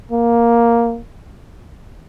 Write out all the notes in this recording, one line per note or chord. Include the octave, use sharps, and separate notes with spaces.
A#3